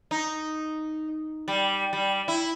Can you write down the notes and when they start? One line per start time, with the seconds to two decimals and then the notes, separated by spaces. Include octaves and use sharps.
0.11 D#4
1.48 G3
1.93 G3
2.28 E4